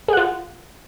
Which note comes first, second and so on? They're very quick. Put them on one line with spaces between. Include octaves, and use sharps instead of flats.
G#4 F#5 F4